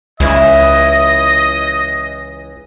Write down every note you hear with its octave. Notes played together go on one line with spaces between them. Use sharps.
C#2 E3 E4 D#5